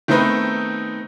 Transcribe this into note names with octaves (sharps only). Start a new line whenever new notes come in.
D#3 A3 B3 C4 D#4 B4